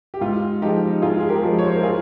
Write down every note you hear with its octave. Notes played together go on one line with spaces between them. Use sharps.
G4
G#2 F4
F3 G#3 D#4 G4
G#2 F4 G#4
G#4
G4 A#4
F3 G#3
C#5
C5
A#4
F4 G#4